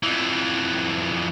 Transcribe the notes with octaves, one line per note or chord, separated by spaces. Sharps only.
F2 E3